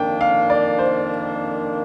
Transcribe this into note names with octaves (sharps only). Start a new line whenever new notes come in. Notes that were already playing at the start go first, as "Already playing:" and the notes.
Already playing: F2 D#3 A#3 D4 G5
F5
D5
C5